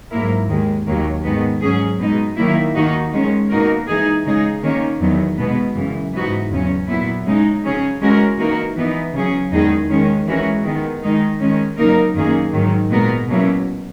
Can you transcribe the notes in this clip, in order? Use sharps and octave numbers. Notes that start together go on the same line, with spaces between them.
G#2 F#3 A#3 E4 A#4
D#2 D#3 G#3
D#2 D#3 F#3 A#3
G#2 D#3 G#3 B3
G#2 F#3 C#4 G#4
B2 G#3 D#4
D#3 F#3 A#3 E4
D#2 D#3 A#3 D#4 F#4
D#3 G#3 C#4
B2 A#3 D#4 F#4 A#4
E3 G#3 D#4 G#4
C#3 G#3 D#4 G#4
D#3 A#3 C#4
E2 D#3 F#3 B3
B2 G#3 B3
F#2 C#3 E3
G#2 E3 B3 D#4 F#4
E2 C#3 F#3 C#4
A#2 F#3 B3 E4
C#3 G#3 D#4
C#3 F#3 C#4 G#4
E3 G#3 C#4 F#4 A#4
E3 A#3 D#4 F#4 A#4
E3 B3 D#4
C#3 F#3 C#4 G#4
E2 D#3 G#3 D#4 G#4
D#3 G#3 C#4
E3 G#3 C#4 F#4 A#4
D#3 G#3 B3
D#3 G#3 D#4
D#3 G#3 C#4
C#3 F#3 A#3 D#4 A#4
F#2 D#3 A#3 C#4 G#4
G#2 D#3 F#3
A#2 G#3 B3 F#4 A#4
B2 F#3 A#3 C#4 E4